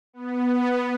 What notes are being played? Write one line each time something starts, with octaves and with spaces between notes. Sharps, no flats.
B3